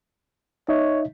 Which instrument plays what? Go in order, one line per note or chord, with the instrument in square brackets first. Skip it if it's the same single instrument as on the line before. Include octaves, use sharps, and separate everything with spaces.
[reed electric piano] D#4 D#5 E5 [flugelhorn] C#5